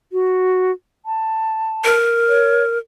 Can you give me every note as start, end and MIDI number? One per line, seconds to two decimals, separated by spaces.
0.12 0.71 66
1.06 1.95 81
1.84 2.78 70
2.29 2.63 73